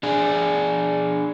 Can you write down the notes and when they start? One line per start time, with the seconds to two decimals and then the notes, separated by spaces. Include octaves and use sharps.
0.03 D4 G#4